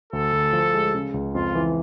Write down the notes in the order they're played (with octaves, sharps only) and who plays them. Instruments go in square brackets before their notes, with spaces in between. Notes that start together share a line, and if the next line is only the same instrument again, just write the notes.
[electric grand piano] D2 [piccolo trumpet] A4
[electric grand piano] D2
F3
G#3
C#3
C#2
[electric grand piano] F2 [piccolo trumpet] F4
[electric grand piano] E3